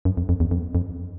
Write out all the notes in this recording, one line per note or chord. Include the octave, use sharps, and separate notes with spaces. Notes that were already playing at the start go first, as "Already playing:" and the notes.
F#2
F2
F2
E2
F2
F2